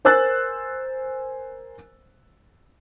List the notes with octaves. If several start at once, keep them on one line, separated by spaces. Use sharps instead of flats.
A#4 C5 G#5 E6 F#6 A6